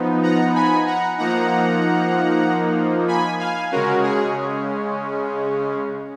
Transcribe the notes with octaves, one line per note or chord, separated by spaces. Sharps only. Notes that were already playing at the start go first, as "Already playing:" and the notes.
Already playing: F3 B3 D#4
F#5 A#5
G#5 B5
F#5 A#5
F3 A#3 D#4 F#5 A#5
G#5 B5
F5 G#5
C#3 G#3 C#4 F#4 A#4
G#4